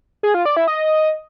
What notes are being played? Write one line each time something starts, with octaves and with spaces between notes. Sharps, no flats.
G#4
F4
D5
E4
D#5